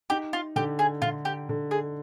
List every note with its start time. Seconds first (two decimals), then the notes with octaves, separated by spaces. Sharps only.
0.10 D#4 G4
0.33 F4
0.56 D3 G4
0.79 G#4
1.02 D3 F4
1.25 G4
1.49 D3
1.71 G#4